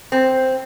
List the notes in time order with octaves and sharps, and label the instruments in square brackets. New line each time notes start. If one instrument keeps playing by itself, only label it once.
[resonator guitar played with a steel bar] C4